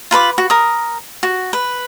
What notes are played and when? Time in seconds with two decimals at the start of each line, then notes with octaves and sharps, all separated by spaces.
0.11 F4 B4 B5 D6
0.38 F#4
0.50 A#4 D#6
1.23 F#4
1.53 B4